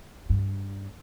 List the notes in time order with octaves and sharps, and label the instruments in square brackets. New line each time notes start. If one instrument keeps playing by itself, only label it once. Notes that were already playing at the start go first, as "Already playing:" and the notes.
[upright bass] G2